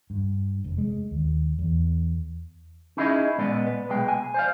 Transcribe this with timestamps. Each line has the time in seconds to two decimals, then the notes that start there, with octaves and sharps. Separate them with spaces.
0.10 G2
0.64 F1
0.78 G#3
1.11 D#2
1.59 E2
2.97 C#4 D#4 E4 G#4 B4 D#5
3.38 A#2 G#3 B3 D5 D#5
3.67 B4
3.89 B1 B2 G#3 G5
4.08 G#5
4.34 C5 D5 F5